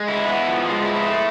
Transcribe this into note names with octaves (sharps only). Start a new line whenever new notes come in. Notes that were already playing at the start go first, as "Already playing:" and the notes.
Already playing: G#3
E4
B3
F3
G#3
E4
A3